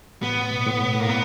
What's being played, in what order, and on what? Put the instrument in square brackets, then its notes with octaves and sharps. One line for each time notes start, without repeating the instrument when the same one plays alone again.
[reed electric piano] A2 [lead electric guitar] B3
[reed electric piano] B2
A#2
A2
G#2
A2
[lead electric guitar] A#3
[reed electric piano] A#2 [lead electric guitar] B3